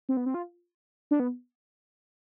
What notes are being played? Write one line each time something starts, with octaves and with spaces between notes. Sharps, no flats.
C4
B3
C4
F4
D4
B3